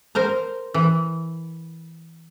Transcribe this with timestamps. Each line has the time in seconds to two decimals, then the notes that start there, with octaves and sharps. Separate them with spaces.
0.15 A#4 C5 A#5
0.74 E3